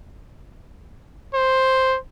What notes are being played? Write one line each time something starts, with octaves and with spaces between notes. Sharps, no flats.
C5